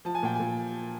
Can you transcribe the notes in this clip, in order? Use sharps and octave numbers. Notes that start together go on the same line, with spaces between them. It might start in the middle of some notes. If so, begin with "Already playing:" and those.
F3 A5
G#5
A#2 G5
A#2 G#5